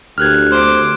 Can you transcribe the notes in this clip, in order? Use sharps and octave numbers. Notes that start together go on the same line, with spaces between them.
D2 G4 A#4 F6 F#6 G#6
C5 D6